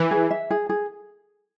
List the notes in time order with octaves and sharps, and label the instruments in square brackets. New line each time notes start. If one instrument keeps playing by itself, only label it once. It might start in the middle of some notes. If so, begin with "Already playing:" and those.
Already playing: [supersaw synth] E3
[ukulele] G#4
E5
G#4
G#4